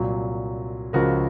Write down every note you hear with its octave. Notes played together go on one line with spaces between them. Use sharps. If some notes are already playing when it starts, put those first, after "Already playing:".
Already playing: C2 A#2 F#3
C#2 C#3 F3 F#4 A#4